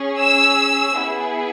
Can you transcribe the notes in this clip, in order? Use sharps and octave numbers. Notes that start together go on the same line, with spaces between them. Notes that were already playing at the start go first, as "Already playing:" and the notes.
Already playing: C#4 G#4
E6
B3 E4 G#4